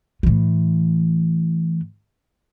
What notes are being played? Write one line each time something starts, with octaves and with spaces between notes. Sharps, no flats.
A2 E3